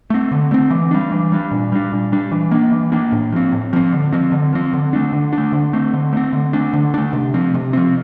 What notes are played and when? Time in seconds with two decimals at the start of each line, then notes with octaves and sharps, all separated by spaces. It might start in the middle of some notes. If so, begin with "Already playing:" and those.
0.10 A3 C4
0.31 D3
0.51 A3 C4
0.70 E3
0.91 G3 D4
1.12 E3
1.32 G3 D4
1.51 A#2
1.72 G3 D4
1.92 A#2
2.12 G3 D4
2.31 E3
2.51 A#3 D4
2.72 E3
2.92 A#3 D4
3.12 A2
3.32 F3 C4
3.52 A2
3.73 F3 C4
3.93 D3
4.13 F3 C4
4.32 D3
4.53 F3 C4
4.73 D3
4.93 A3 D4
5.13 D3
5.33 D4
5.38 A3
5.52 D3
5.73 A3 C4
5.94 D3
6.13 A3 C4
6.33 D3
6.53 A3 D4
6.73 D3
6.94 A3 D4
7.13 C3
7.34 F3 C4
7.54 C3
7.73 F3 C4